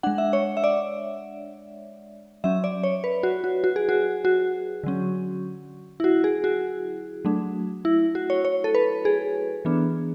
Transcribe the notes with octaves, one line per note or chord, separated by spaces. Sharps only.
G#3 D4 F#5
E5
C#5
E5
D5
F#3 C#4 E5
D5
C#5
B4
F#4
F#4
F#4
G#4
F#4
F#4
D3 F#3 C#4
E4
F#4
G#4
F#4
F#3 A3 D4
E4
F#4
C#5
C#5
A4
B4
G#4
E3 B3 D4